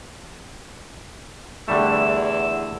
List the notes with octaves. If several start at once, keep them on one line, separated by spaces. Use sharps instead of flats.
E2 D3 G3 A3 E6